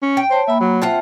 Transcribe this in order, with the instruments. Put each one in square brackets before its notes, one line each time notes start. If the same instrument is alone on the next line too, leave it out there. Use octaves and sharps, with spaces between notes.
[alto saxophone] C#4
[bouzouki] G5
[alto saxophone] C5 [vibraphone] C#5 A5
[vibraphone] A#3 B5 [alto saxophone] E5
[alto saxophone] F#3
[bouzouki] C4 F4 F#5 [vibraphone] E5 A5